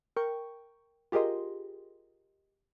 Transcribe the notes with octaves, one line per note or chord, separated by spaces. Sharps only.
A#4 G5 C#6
F4 G4 G#4 A#4 D#5 C6